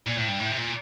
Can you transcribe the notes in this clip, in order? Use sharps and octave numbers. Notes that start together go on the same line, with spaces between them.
A#2
A2
G2
A2
C3
A#2